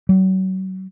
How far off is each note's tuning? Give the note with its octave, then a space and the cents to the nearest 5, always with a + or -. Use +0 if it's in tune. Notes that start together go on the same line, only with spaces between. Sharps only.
F#3 +35